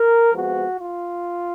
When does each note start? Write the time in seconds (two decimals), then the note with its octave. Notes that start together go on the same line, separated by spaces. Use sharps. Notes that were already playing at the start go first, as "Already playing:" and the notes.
Already playing: A#4
0.33 F2 F3 G#3 B3 F#4
0.79 F4